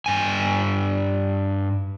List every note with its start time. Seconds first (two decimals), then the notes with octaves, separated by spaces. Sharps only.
0.06 G2 G#5